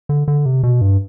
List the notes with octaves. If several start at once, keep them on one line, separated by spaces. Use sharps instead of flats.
D3
D3
C3
B2
G2